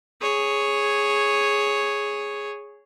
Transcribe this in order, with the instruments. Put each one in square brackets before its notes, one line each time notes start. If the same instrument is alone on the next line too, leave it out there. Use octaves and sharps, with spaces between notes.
[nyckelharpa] G#4 C#5